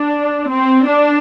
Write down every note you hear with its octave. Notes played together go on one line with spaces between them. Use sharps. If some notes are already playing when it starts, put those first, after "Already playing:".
Already playing: D4
C4
D4